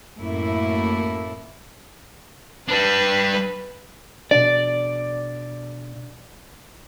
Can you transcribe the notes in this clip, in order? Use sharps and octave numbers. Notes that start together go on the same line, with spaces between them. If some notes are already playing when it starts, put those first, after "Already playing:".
F#2 A2 A3 A#3 E4
G3 D4 B4
B2 D4 D5